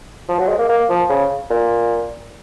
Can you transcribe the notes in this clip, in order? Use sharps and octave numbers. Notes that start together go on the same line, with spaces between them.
F3
F#3
G#3
A#3
A#3
F3
C#3
A#2